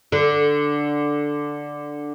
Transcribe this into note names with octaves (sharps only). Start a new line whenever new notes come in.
D3